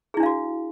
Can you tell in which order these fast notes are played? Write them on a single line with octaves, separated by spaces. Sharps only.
G#4 E4 D4 F5 F#4